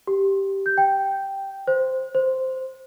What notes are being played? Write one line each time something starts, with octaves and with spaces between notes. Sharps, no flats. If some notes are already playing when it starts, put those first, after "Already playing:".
G4
G6
G5
C5
C5